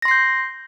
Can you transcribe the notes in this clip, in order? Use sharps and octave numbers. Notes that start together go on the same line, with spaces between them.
C6 G6 A#6 C7